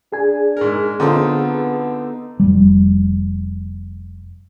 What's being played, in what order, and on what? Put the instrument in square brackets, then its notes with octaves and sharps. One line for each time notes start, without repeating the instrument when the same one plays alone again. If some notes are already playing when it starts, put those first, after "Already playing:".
[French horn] D4 [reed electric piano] G#4 G#5
[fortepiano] G#2 A#4
[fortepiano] D3 C4 F4 [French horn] B3 [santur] D#4 A4
[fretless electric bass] F1 G3